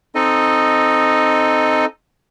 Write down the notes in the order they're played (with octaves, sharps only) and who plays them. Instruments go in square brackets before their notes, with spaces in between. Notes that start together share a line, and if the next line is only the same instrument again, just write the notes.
[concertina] C4 D#4 A4 D#5